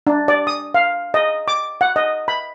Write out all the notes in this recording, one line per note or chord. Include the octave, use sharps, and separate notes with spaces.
D4
D5
D#6
F5
D#5
D6
F#5
D#5
B5